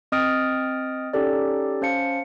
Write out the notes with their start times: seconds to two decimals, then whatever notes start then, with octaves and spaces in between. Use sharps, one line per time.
0.12 C4 D#5 D#6 F6 A6 D7
1.13 C#4 D#4 G4 A4 D5
1.82 C#4 C5 F5 A5 C#7